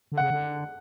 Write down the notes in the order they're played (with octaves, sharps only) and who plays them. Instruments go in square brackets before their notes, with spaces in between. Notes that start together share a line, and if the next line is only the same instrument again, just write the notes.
[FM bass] D3
[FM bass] C#3 [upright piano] F#5
[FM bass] D3